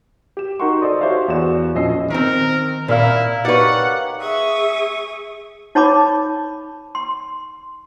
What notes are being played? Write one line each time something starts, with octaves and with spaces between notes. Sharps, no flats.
G4 E7
D#4 F#4 A#4 F#5 C6 C#6
A4 C5 D5 D#5 D#6
F#4 G4 C5 C#5 E5 F5
E2 F#4 D5 E7
A#1 F3 C#4 D#5 E6 C7
D#3 C4 A#4
A#2 E4 A#4 F5
D#4 G4 B4 C#5 D5 F#5
G#4 E5 C#6 D#6
D#4 C#5 A5 B5 D6
C6